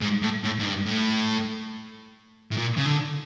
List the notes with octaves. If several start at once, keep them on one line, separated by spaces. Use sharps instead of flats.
G#2
A2
A2
G#2
G2
A2
A2
A#2
C#3
D3